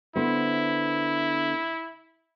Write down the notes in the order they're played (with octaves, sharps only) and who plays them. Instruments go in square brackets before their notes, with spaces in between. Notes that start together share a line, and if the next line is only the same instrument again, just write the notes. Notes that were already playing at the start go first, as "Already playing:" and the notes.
[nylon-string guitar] D3 B3 C5 [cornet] E4